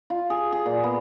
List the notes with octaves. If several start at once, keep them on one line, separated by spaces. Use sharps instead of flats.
F4
G#4
G#4
A#2
B3